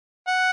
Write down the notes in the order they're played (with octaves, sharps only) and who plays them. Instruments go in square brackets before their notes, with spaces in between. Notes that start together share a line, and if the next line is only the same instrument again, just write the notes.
[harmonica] F#5